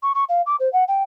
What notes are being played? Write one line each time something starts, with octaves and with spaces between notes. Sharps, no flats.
C#6
C#6
F5
D6
C5
F#5
G5